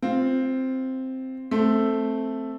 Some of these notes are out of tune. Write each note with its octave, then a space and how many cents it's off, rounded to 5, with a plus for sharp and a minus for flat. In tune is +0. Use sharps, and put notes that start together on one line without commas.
C4 +0 F4 +0
A3 +0 C4 +0